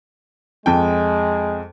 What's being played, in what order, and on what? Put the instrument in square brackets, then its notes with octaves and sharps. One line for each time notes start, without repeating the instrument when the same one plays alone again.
[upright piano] F2 G5 [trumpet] G#3